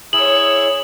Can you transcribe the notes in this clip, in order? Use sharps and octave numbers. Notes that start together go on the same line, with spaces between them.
E4 G#4 C#5 E6 F#7